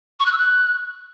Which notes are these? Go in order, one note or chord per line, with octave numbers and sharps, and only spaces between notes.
C#6
F#6
E6
F#6